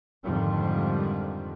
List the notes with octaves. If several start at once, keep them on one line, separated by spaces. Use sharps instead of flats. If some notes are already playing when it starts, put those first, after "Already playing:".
F2 G#2 D3 D#3 F3 G3